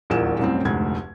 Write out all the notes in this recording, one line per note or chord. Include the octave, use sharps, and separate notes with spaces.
D#1 A#1 E2 A#4 F#5 E7
C2 F#2 A2 C4
F1 D2 G#2 G#6